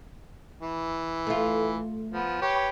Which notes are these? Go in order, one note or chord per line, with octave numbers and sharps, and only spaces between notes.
E3
A3 F4
F3 B3
G4 B4 C#5